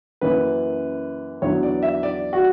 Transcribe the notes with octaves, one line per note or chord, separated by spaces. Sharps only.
F#2 E3 A#3 C#4 B4
E2 D3 F#3 B3 C#5
D5
E5
D5
F#4